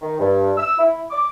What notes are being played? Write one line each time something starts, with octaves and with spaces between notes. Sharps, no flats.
D#3
G2
E6
E4
D6